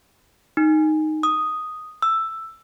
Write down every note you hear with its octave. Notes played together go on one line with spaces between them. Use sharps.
D#4
D#6
E6